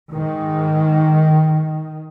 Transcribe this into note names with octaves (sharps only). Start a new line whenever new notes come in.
G#2 D#3